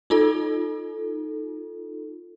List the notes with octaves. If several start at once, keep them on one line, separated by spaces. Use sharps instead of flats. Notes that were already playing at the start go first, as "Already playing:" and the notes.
D#4 F4 A4